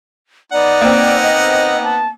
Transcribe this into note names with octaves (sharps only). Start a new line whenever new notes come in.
B3 D#4 D5 F#5
A#3 C4
D#5
A5